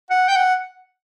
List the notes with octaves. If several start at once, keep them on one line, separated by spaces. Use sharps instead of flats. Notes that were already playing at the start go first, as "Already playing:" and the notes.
F#5
G5
F#5